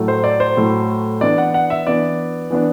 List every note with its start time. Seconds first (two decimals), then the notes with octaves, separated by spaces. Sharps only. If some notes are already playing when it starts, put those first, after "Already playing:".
Already playing: A2 F#3 A3
0.08 C5
0.24 D5
0.40 C5
0.57 A2 F#3 A3
1.21 E3 B3 D4 D5
1.38 F#5
1.54 F#5
1.70 E5
1.87 E3 B3 D4 D5
2.50 E3 B3 D4